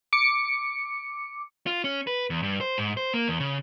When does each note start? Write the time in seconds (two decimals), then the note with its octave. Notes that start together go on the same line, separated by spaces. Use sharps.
0.13 D6 C#7
1.66 F4
1.84 C#4
2.07 B4
2.30 E2
2.43 G2
2.61 C5
2.78 G#2
2.97 C5
3.14 A#3
3.28 E2
3.40 C#3